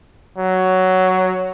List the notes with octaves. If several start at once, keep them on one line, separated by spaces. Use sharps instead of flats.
F#3